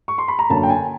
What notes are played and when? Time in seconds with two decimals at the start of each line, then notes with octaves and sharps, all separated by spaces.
0.08 C#6
0.18 C6
0.28 B5
0.39 A#5
0.49 F#2 D3 F#3 A#3 A5
0.63 G5
0.70 G#5